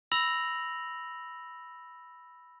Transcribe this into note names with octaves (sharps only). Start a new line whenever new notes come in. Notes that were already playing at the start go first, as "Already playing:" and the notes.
B5 E6 A#6 F7 F#7